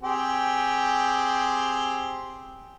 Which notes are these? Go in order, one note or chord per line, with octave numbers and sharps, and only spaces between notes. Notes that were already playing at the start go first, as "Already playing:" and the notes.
C4 G4 G#4